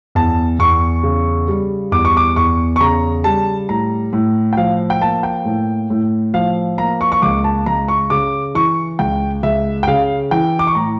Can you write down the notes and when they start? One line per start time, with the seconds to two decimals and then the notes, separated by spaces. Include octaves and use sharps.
0.15 E2 A5
0.59 E2 C#6
1.03 C#3
1.48 G3
1.92 E2 D6
2.05 C#6
2.17 D6
2.36 E2 C#6
2.76 C#6
2.80 C#3 A#5
3.24 G3 A5
3.69 A2 A#5
4.13 A2
4.53 G5
4.57 F3 F5
4.90 G5
5.01 A#3 A5
5.23 G5
5.45 A2
5.90 A2
6.34 F3 F5
6.78 A#3 A#5
7.01 C#6
7.12 C#6
7.22 C#2 D6
7.44 A5
7.66 C#2 A#5
7.88 C#6
8.10 C#3 D6
8.55 E3 C#6
8.99 C#2 G5
9.43 C#2 E5
9.83 G5
9.87 C#3 F5
10.31 E3 G5
10.59 D6
10.67 C#6
10.75 A2 A#5